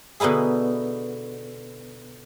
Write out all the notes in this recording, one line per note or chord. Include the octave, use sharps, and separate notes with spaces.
B2 D3 D#4 E4 G#4